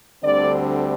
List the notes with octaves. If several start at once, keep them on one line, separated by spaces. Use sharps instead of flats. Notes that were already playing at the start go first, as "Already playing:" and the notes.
D2 D3 G3 C4 D5